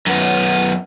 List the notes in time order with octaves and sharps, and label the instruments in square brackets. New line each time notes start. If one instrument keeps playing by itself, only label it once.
[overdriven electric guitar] F#2 B3